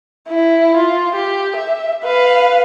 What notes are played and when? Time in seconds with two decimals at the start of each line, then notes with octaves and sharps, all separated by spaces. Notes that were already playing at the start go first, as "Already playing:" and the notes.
0.28 E4
0.77 F4
1.15 G4
1.56 E5
2.04 B4 F5